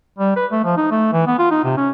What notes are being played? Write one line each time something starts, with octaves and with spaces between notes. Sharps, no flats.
G3
B4
A3
F3
D#4
A3
E3
B3
F4
D#4
C3
C#4